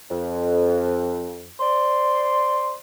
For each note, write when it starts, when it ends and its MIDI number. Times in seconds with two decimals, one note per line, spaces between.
0.10 1.49 41
1.60 2.76 72
1.60 2.76 74
1.60 2.76 84